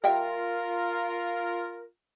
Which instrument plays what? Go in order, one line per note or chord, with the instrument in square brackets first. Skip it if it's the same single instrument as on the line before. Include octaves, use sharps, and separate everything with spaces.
[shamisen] G3 E5 G5 [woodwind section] F4 A#4